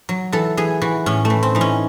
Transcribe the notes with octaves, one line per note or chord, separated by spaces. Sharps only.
F#3
E3 A4
E3 G#4
E3 F#4
A2 C#4
A3
E3
C4
E3 D#4
C#4